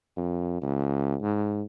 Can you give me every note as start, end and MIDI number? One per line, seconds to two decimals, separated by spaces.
0.17 0.61 41
0.62 1.16 37
1.22 1.62 44